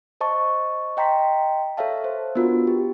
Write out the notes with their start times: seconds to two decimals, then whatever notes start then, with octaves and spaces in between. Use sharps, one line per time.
0.21 C5 D#5 A5 C#6
0.97 D#5 G5 A#5 C6 B6
1.77 A4 C#5 E5 F5 A5
2.04 C5
2.35 B3 D4 F4 F#4 A#4
2.67 G4